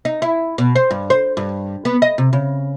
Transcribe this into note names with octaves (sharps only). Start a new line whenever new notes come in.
D#4
E4
B2
C5
G2
C5
G2
B3
D#5
C3
C#3